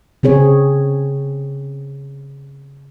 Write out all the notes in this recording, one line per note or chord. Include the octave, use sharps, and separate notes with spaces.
C#3 C4 G#4 C#5